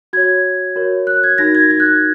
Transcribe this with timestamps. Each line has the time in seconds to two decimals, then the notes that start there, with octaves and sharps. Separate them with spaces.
0.13 F#4 C#5 G#6
0.76 F#4 A#4 C#5
1.07 F#6
1.23 G#6
1.38 D#4 F#4 A#4 A#6
1.55 G#6
1.71 G#6
1.80 F#6
1.85 G#6